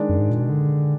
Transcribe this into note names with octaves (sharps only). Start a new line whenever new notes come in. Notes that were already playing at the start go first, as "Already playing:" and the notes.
Already playing: D#3 G#3 D4 G#4 D5
F#2
G#2
A#2
B2
D3